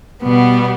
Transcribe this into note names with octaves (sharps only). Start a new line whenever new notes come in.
B2 G3 B3